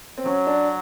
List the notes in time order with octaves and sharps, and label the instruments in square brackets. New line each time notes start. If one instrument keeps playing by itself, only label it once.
[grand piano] C4
[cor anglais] F#3 [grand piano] C#4
[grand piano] D4